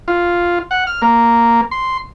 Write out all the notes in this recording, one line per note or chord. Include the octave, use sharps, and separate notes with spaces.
F4
F#5
F6
A#3
C6